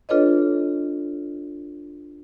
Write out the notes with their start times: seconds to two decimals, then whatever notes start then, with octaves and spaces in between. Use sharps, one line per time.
0.09 D4 F4 A4 B4 C#5 D#5